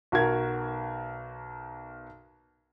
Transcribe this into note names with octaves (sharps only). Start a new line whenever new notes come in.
B1 F#4 A#4 G#6